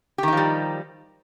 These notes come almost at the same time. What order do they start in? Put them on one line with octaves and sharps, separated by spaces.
G4 D#3 D#4 F3 G3